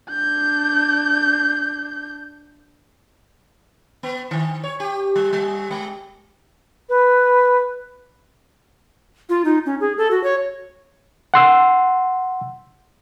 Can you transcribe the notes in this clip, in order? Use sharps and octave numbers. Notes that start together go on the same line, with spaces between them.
D4 G6
B3
D#3
C#5
G4
G3
G3
G#3
B4
F4
D#4
C#4
G#4
A4
F#4
C#5
F#5 C6 E6